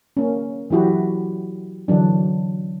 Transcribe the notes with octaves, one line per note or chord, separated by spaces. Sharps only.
A#3 C#4
E3 F#3 E4 F#4 G4
D3 E3 F#3 D4